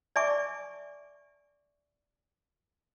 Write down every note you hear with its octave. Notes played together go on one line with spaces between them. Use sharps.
D5 E5 G#5 C#6 D6